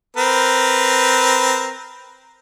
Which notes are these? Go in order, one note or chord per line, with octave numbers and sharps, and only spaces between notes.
C4 A#4 B4